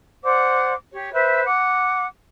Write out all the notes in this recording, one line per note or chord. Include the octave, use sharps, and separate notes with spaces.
C5 D5 F#5 D6
G4 C#5
B4 C5 E5
F#5 D6